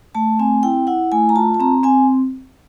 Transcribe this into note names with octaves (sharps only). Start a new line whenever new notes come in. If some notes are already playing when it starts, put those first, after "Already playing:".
A3 A5
C4 G#5
E4 G5
E4 F#5
A3 G#5
A#5
F4 A5
A5
C4 A#5
C4 G#5